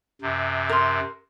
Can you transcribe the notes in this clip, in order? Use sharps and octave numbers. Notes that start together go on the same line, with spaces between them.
F#2 C3
A#4 C6